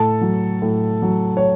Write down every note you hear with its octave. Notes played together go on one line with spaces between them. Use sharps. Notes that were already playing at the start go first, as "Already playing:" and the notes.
Already playing: A2 A4
F#3
A2
F#3
C#5